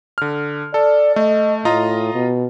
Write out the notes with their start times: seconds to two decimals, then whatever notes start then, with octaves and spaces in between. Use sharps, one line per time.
0.18 D3 F6
0.74 A4 D5
1.16 A3 D#5
1.65 A2 F4 D#5 A#5
2.15 B2